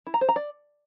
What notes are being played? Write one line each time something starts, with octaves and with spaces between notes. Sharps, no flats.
E4
A#5
C5
A#5
D5